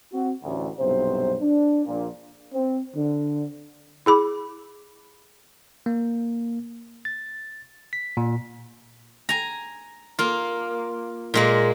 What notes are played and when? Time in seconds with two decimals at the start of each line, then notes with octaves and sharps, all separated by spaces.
0.12 C4 F#4
0.43 A1 D2
0.79 B1 G2 C3 C5
1.42 D4
1.86 A#1 A#2
2.54 C4
2.95 D3
4.06 E4 G#4 B5 D6
5.86 A#3
7.05 A6
7.93 B6
8.17 A#2
9.29 G#5 A#5
10.19 A#3 F4
11.34 A#2 G#3 A#3